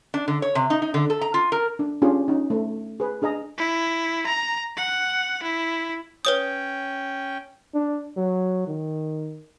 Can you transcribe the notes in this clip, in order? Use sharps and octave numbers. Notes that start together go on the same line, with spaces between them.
D4
D3
C#5
C3
D#4
D#4
D3
A4
A#5
F4
A#4
D4
C#4 D4 F4 G4 G#4
C#4 D#4
A3
G#4 B4
D4 G#4 D#5 A#5
E4
A#5
F#5
E4
C#4 B4 C#5 G5 D#6
D4
F#3
D#3